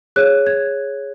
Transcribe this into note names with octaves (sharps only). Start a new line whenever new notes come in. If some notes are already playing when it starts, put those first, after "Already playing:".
G#4 C#5 F#6
G#6